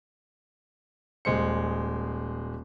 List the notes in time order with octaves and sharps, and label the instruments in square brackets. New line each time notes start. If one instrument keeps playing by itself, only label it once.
[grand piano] D#1 G#3 C5 C#7